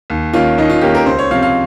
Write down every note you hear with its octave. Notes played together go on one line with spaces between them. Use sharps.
D#2
D#3 A#3 C#4 F4
D#2 D#4
F4
D#3 A#3 C#4 G4
A#4
C#2 C5
C#5
C3 F3 C4 F5
F5